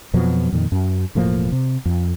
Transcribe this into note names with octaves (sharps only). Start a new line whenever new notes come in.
F2 B2 F3 F#3
F2 A#2 D#3
F#2
E1 A2 F3 A#3
C3
F2